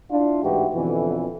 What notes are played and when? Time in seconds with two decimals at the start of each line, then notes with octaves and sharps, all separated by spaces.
0.10 D4 E4 F4
0.43 A1 G#2 E3 E4 F#4 G4
0.74 F2 B2 D3 E3